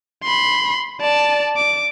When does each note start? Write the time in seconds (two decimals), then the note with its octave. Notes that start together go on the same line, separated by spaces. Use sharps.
0.23 B5 C6
1.01 D5 A5
1.57 D6